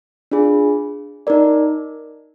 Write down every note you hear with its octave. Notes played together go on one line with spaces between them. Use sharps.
D4 F4 G#4
D#4 A#4 D5